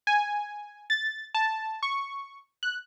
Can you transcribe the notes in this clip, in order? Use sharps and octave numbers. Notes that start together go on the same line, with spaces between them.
G#5
A6
A5
C#6
F#6